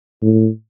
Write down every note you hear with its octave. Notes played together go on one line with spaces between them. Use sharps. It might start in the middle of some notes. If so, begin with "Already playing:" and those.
A2